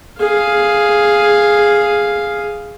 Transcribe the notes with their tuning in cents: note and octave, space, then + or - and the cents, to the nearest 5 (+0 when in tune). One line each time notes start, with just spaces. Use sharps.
G#4 +0 F5 +0